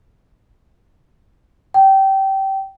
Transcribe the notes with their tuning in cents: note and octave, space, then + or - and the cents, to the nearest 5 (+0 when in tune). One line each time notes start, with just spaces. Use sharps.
G5 -20